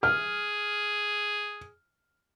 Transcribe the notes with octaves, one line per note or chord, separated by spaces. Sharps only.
G#4 F6